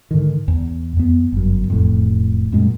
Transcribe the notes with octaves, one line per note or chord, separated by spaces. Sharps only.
G#2 D3 D#3
E2
F2 B3
G1 F#2
E1 F2 A2
F#2 A#2 G#3